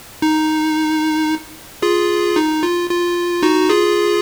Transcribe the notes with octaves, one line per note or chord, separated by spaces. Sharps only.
D#4
F4 G#4
D#4
F4
F4
D#4 F#4
F4 G#4